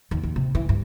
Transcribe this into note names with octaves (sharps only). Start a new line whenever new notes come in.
D#2
D#2
C3
E3
G2